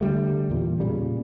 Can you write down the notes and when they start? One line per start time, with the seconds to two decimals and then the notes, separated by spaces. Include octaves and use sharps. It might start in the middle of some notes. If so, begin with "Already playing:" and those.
0.01 D3 D#3 G3 A3
0.50 E2 A#2
0.80 A#2 C#3 G3